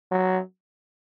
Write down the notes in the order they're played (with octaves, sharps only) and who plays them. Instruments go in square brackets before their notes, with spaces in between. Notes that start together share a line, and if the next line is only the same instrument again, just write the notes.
[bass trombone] F#3